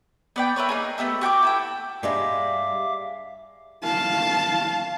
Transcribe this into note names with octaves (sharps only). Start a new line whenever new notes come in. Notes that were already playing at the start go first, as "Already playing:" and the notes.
B3 D5 G5
E4 A#4 B4 C#5
A#3 D#4 G#4
A3 B3 G4 E5
F#4 G5 A5 D6
E4 A4 G5
G2 G3 G#3 E5 F5 D6
F5 A5